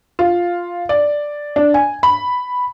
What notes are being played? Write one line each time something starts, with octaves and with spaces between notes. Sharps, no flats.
F4
D5
D4
G#5
B5